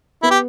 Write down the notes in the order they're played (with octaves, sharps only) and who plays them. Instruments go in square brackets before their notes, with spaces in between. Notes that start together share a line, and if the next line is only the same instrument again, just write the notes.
[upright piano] B3 [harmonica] E4
[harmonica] G4